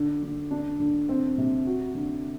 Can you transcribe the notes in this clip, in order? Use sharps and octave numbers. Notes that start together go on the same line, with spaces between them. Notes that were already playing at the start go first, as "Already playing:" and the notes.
Already playing: D3
D3
D4
D3
C4
C3
F#4
D3